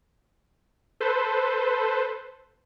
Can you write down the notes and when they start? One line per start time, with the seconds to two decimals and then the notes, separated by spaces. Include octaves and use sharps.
1.00 A4 B4 C5